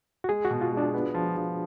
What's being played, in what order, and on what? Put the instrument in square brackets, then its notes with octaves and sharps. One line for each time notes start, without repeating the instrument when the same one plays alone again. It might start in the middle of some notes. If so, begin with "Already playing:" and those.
[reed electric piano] F#4
[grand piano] G#3 [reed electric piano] G#4
[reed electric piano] F#4
[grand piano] B2
[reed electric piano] F4
[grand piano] G#3 [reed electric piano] D4
[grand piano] B3
F3
F3